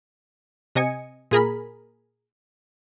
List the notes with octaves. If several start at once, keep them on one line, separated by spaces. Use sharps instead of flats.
C3 D#5 G#5 C#7
A#2 G#4 A#4 B5